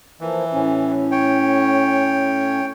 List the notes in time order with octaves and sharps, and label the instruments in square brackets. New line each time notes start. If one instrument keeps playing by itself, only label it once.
[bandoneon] E3 [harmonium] F3 A#3
[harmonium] A2 C#4
[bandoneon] C#5 G5